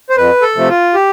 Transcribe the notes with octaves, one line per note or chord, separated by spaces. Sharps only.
C5
F2 B4
A4
C3 F3 A3
F4
G4